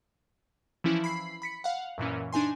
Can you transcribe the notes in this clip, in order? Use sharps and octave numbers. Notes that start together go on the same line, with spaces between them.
E3 F3 C#4 E4
B5 C7
B5 B6 C#7
F5 F#5
F#2 A#2 E3 C#4
D4 D#4 G#5 C6